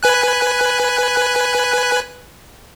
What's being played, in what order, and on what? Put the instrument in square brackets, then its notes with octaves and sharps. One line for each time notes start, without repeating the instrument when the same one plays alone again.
[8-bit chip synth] B4 G#5 F#6